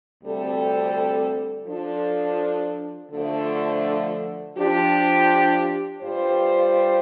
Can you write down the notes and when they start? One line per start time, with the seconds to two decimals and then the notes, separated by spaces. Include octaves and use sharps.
0.22 D2 C3 G3 C4 A4
1.67 F3 D4 A4
3.12 D3 F3 A3
4.57 F3 D4 G4
6.01 G2 G3 F4 C5